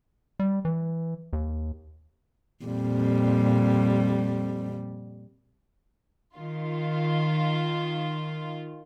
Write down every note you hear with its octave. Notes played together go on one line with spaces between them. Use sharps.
G3
E3
D#2
F2 A#2 G3
D#3 F4